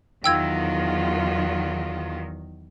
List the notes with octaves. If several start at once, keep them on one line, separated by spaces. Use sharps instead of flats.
E2 D#3 F#3 F4 F#4 G5 E6 G#6